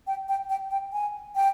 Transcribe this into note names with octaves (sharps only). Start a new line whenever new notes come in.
G5
G5
G5
G5
G#5
G5